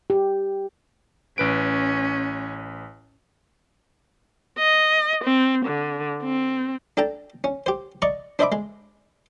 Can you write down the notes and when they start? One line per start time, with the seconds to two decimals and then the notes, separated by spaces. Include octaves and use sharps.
0.10 G4
1.38 A1 C#4 B4 D7
4.59 D#5
5.25 C4
5.66 D3
6.23 C4
6.97 D4 A4 G5 A5 A#5
7.44 C#4
7.66 G4 C5
8.02 D5 D#5 A#5 C#6
8.39 D4 C5 D#5 E5 B5 D6
8.52 G#3